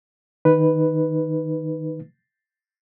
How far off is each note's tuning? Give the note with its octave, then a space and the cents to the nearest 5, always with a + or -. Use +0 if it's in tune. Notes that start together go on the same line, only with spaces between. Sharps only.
D#3 +0 D#4 +0 B4 +0